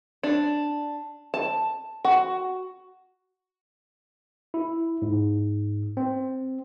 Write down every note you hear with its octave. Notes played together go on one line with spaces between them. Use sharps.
D4
A5
F#4
E4
G#2
C4